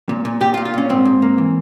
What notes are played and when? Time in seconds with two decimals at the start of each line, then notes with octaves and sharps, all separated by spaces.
0.09 A#2
0.25 A#2
0.41 A#2 G4
0.54 F4
0.57 A#2
0.65 F4
0.74 A#2 C#4
0.89 G#2 C4
1.05 G#2
1.22 A#3
1.38 E3